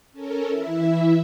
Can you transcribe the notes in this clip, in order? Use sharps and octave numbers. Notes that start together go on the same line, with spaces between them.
C#4 A4 A#4
E3 E4 E5